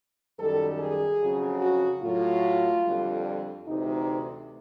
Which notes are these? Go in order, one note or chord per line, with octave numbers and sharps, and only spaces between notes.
F#2 D#3 G3 A4
G#4
F2 C#3 F#3
F#4
A2 F#3 F4
F2 D3 G3
D2 C3 E3 D#4